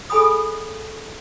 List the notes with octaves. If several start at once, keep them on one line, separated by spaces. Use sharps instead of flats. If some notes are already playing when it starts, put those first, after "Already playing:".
G#4 A4 G#5 B5 D#6